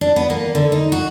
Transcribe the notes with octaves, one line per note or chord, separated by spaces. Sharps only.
D4
B3
A#3
D3
D#4
F#4